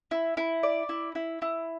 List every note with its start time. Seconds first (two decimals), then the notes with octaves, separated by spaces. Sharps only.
0.11 E4
0.37 E4
0.63 D5
0.89 E4
1.15 E4
1.42 E4